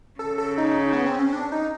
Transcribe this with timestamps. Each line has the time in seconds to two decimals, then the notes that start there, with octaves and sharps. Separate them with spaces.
0.19 C#3 A4
0.38 A4
0.58 D#4
0.93 B3
1.06 C4
1.19 C#4
1.33 D4
1.52 D#4